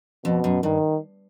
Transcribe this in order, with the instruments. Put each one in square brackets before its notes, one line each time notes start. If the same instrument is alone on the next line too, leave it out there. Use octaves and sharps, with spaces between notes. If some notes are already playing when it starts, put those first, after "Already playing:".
[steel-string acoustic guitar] F2 [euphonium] B2
[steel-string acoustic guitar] F#2
[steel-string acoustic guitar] G2 [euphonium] D#3